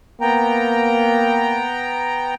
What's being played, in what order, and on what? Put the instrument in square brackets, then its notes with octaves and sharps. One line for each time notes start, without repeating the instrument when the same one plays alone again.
[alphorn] A#3 [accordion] B3 G5 A#5